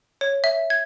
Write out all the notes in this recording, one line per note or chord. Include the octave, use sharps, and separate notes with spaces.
C#5
E5
G#6